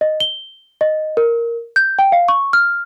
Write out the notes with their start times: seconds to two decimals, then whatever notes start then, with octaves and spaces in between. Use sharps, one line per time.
0.01 D#5
0.20 G7
0.81 D#5
1.17 A#4
1.76 G6
1.99 G5
2.12 F5
2.28 C#6
2.53 F6